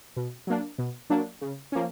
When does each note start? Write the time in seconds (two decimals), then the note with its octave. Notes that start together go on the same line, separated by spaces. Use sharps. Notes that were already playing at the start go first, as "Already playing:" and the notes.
0.16 B2
0.47 F#3 A#3 D4
0.78 B2
1.10 F#3 A#3 D4
1.41 C#3
1.72 F3 A#3 C#4